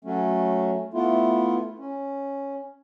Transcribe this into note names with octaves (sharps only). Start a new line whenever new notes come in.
F#3 A3 C#4
A3 B3 E4 F4
C#4